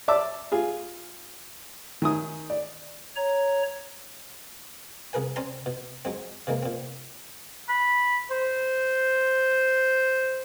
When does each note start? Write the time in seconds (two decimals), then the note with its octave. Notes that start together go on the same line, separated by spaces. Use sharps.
0.08 D5 E5 A5 D6 E6
0.52 F4 G#4
2.02 D#3 G#5 D#6
2.50 D5
3.16 C#5 A#5
5.13 C2 G#4 A#4 B4 G#5
5.36 C4 C#4 D5 G#5 A#5 C6
5.66 B2
6.05 F#3 G#3 C4
6.47 C3 E3 G#3 A#3
6.63 A#2 C4
7.68 B5
8.30 C5